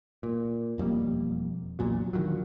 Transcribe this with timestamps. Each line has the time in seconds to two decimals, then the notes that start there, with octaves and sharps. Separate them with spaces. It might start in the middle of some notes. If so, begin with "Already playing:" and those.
0.23 A#2
0.78 E1 F2 G3 A#3
1.79 A#1 E2 A#2 F#3
2.13 D3 D#3 F3 F#3